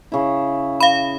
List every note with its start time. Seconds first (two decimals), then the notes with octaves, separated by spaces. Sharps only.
0.12 C#3 E4
0.80 F5 B5